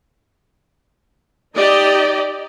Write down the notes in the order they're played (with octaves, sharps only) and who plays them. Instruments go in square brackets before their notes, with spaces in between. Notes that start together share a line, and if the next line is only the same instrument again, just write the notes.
[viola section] D#4 G4 D5 D#5